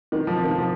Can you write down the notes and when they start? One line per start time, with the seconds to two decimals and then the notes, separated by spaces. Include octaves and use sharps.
0.12 D#3
0.27 F3
0.43 D#3
0.58 F3